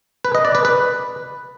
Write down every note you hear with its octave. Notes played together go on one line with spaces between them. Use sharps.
B4
D#5
D5
B4
B4